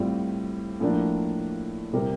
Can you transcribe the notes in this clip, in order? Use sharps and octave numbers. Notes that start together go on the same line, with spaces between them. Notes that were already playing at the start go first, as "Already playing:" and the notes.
Already playing: A2 G3 C4 F4
A2 F3 A#3 D4
C3 G3 C4 G4 A#4